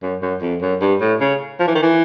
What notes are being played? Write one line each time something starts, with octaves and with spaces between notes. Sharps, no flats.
F#2
F#2
F2
F#2
G2
A2
C#3
F3
E3
D#3
E3